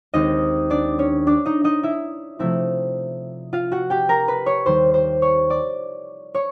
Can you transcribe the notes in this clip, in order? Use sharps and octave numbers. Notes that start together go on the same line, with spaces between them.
D#2 D#3 G#3 C4 D#4 D#5
D4 D5
C#4 C#5
D4 D5
D#4 D#5
D#4 D#5
E4 E5
C3 F3 A3 C4 E4 E5
F4 F5
F#4 F#5
G4 G5
A#4 A#5
B4 B5
C#5 C#6
D#2 D#3 G3 C5 C6
C5 C6
C#5 C#6
D5 D6
C#5 C#6